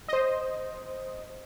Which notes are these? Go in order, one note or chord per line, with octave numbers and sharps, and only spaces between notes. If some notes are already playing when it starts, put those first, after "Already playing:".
C5 D#5